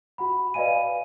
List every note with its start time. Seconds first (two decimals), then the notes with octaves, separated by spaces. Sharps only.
0.18 F#4 F#5 B5
0.54 B4 D5 D#5 F5 G#5 D#7